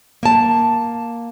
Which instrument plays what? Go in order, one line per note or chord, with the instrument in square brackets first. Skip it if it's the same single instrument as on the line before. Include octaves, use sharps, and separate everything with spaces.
[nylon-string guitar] A#3 A5